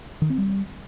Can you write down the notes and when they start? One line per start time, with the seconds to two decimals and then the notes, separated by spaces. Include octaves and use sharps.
0.22 D#3
0.30 C4
0.38 G3